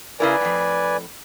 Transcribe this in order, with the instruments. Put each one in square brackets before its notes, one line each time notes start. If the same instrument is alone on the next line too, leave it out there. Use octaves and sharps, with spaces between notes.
[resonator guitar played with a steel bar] C#3 E4 A#4 [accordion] B4 D5 G#5
[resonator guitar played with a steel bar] F2 A2